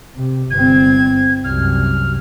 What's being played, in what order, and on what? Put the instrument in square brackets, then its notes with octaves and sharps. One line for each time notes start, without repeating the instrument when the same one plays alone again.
[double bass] C3
[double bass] G1 C4 [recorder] G#6
[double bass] C2 F#2 [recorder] F6